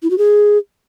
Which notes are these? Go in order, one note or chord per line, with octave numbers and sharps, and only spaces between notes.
E4
F#4
G#4